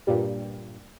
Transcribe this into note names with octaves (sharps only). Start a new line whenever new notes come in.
G2 A#2 G3